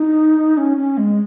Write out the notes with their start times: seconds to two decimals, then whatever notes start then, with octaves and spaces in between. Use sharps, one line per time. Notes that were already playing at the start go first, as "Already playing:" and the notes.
Already playing: D#4
0.57 C#4
0.77 C#4
0.98 G#3